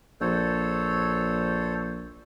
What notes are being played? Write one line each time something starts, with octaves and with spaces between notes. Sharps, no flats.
A#1 A4 C5 C#5